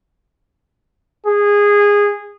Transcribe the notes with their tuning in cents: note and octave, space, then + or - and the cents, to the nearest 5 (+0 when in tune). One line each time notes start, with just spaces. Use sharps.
G#4 -20